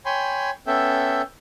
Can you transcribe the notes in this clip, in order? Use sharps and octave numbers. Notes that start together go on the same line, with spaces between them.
C#5 G5 G#5 B5 C6
B3 C#4 A4 E5 G5